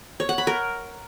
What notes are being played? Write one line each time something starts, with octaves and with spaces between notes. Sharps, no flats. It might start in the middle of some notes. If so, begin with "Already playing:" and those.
C#5
F#5
B5
A#4